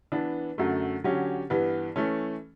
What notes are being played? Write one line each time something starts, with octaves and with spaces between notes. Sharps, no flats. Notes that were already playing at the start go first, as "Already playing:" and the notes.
E3 B3 D4
F#2 D3 F#3 A3
D3 F#3 C#4 G4
G2 E3 B3
E3 A3 C#4